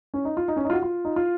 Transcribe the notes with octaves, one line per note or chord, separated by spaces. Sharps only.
C#4
D#4
F4
D#4
C#4
D#4
F4
F#4
F4
D#4
F4